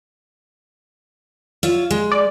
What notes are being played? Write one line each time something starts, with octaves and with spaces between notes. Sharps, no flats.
F4 C#5 E5
G#3
D5